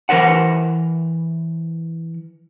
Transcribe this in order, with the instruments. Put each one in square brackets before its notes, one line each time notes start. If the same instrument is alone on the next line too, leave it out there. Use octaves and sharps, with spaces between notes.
[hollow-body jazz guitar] E3 A#4 C5 F#5